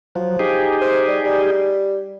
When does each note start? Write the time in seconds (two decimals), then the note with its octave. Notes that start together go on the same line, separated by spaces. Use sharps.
0.15 F3 F#3
0.39 D#4 G4 G#4
0.81 C5
1.08 G3
1.24 G3